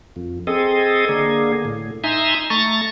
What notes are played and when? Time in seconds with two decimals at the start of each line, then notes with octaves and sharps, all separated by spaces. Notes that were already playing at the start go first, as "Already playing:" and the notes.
0.16 F2
0.47 C4 G#4 A4 D#5
1.09 D3 A#3 G#4
1.65 A2
2.04 D#4 E5 G#5 A#5 C6
2.50 A3 A#5 C#6 A6